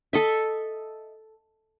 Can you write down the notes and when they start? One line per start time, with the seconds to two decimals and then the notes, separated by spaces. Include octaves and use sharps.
0.13 A4 D#5 E5